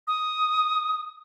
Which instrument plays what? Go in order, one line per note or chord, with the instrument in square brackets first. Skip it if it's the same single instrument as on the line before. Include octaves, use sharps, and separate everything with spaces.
[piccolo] D#6